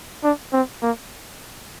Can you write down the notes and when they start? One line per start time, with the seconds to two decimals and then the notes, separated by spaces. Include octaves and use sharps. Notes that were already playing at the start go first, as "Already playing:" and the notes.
0.23 D4
0.53 C4
0.82 A#3